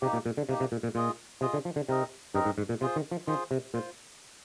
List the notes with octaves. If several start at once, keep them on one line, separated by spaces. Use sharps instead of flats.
C3 A#3 D#4 G4
A#2
A#2
D3
C3 A#3 D#4 G4
C3
A#2
A#2
A#2 F4 G#4 D#5
C3 F4 G#4 D#5
D3
F3
D3
C3 C4 D#4 A#4 D#5
G2 C4 D#4 A#4 D#5
G#2
G#2
A#2
C3 F4 G#4 C5
D#3
F3
D#3 F4 G#4 C5
C3
A#2 F4 C5